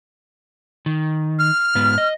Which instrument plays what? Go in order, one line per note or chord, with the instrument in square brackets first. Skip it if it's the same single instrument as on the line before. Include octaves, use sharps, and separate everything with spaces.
[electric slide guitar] D#3
[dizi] F6
[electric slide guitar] G#2 B3
D#5